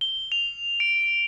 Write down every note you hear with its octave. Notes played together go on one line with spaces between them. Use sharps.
G7
F7
D7